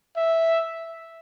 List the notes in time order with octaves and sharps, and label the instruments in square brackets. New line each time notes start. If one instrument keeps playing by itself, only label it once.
[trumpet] E5